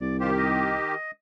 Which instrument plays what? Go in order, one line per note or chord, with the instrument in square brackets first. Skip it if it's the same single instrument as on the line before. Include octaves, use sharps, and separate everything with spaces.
[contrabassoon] C2 [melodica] D5
[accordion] D#3 G4 [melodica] F4 C5
[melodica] D#5